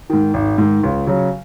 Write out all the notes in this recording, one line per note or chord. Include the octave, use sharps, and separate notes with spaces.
G#2 D#3
G#1
G#2 D#3
C#2
C#3 F#3